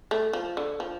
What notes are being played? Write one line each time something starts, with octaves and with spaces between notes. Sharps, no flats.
A3
F3
D3
F3